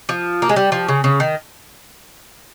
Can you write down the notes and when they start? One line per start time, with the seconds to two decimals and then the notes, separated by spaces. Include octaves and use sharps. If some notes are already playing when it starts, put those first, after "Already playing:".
0.09 F3
0.42 A#3
0.49 G#3
0.56 G3
0.72 F3
0.88 C#3
1.04 C#3
1.20 D#3